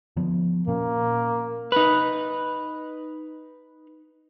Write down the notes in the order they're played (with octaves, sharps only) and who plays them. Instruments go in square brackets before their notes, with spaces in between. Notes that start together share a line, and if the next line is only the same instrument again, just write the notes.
[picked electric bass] D3 F3 B3
[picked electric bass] A#2 C#4 [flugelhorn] A#3
[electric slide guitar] D#4 B4